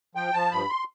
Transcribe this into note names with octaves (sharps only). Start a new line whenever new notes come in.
F3 G5
F3 A5
G2 B5
C6